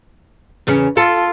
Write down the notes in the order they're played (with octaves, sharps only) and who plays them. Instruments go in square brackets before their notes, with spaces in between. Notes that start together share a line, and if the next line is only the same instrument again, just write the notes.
[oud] E2 C#3 C#4
[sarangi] F4 [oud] A4